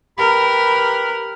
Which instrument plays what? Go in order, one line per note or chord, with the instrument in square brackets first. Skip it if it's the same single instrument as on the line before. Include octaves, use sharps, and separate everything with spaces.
[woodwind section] G4 B4 B5 [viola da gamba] A#4